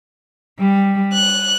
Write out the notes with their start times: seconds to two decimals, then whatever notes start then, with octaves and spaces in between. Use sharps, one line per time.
0.59 G3
1.13 F#6